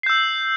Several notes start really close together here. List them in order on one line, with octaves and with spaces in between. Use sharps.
C7 G6 E6